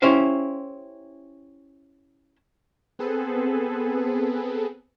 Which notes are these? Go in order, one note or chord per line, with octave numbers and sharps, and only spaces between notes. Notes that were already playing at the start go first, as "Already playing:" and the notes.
C#4 E4 G4 C5 F5
B3 C4 G#4 A4 B4